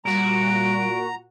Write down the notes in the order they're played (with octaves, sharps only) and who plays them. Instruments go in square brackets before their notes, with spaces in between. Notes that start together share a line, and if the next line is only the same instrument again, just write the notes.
[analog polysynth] A#2 F#4 [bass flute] G3 [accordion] A#5 [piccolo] D7